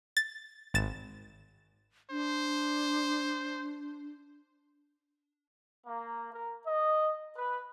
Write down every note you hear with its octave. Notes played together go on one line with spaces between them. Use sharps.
A6
G#1 A6 E7
D4 C5
A#3
A#4
D#5
B4